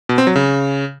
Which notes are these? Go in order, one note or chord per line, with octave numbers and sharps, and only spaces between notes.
B2
C4
F#3
C#3